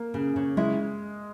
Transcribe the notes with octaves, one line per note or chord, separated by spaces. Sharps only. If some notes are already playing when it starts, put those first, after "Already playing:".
Already playing: A#3
C#3
C#3
G#3 E4